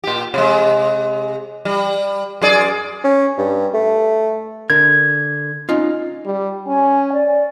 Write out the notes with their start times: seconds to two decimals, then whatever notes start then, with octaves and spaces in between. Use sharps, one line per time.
0.04 A#2 G4
0.34 C3 G#3
1.65 G3
2.42 F#2 G#4 D5
3.04 C#4
3.38 G2
3.73 A3
4.70 D3 A#4 G#6
5.69 C#4 D#4 F4
6.25 G3
6.67 C#4 G#5
7.13 D5